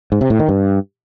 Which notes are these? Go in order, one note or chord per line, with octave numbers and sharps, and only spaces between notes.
G#2
C3
A2
D#3
G2